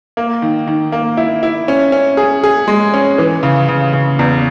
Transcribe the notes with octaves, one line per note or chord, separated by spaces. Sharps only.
A#3
D#3
D#3
A#3
E4
E4
C#4
C#4
G#4
G#4
G#3
C#4
E3
C#3
C#3
C#3
E2